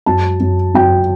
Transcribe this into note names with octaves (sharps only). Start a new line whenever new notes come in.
F#2 A5
F#2
F#2 G5